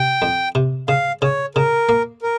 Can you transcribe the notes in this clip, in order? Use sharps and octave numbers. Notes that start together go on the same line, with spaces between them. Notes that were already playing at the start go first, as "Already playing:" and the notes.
Already playing: C3 G5
F2
C3
C#3 F5
C#3 C#5
C#3 A#4
A#3
A#4